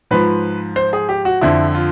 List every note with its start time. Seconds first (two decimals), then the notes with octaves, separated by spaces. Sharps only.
0.11 G#2 F3 B4
0.76 C5
0.93 G#4
1.09 G4
1.25 F#4
1.41 F2 D3 F3 E4
1.75 F4